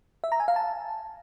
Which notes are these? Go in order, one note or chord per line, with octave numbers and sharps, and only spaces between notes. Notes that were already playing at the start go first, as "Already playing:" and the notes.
E5
A#5
G#5
F5
A5